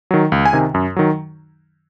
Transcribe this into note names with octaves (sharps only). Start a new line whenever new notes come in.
D#3 F#3
C#2
G#5
C3 D#3
F#2
D#3 F#3